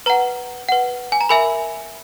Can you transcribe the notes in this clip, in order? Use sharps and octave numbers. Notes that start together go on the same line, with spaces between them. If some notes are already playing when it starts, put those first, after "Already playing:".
B4 F#5 A#5
B4 F#5
G#5
A#5
A#4 E5 G#5 B5